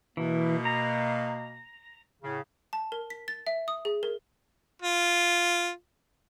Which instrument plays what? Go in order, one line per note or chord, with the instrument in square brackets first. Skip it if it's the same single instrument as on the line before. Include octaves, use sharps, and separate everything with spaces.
[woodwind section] B2 A#3 [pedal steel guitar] E3
[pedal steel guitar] A#5
[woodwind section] A2 C#3
[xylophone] A5
A#4
B6
A6
E5
D#6
G#4
A#4
[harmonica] F4